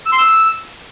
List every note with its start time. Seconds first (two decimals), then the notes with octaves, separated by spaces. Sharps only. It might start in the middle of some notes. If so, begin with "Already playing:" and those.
0.06 E6
0.12 C6
0.18 E6